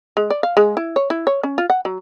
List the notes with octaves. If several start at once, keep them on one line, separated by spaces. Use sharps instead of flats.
G#3
D5
F5
G#3
E4
C#5
E4
C#5
C#4
F4
F#5
F#3